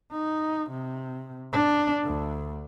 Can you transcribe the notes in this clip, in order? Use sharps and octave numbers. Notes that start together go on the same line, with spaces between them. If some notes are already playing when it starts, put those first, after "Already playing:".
D#4
C3
D4
D2